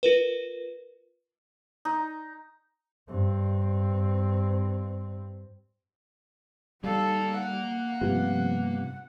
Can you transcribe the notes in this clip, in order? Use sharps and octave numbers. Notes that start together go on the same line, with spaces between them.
F4 A#4 B4
D#4
G2 C4
G3 A#3 D#4 A4 F5
F#5
G2 C3 F3 B3